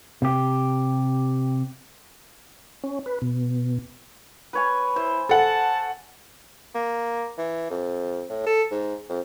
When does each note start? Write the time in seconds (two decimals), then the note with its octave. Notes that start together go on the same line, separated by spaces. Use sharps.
0.22 C3 G4
2.84 C#4
3.06 B4
3.22 B2
4.53 B4 C#5 G#5
4.96 E4 C5
5.29 A4 F#5 A5
6.75 A#3
7.38 E3
7.71 F2
8.30 A2
8.46 A4
8.71 G#2
9.09 F2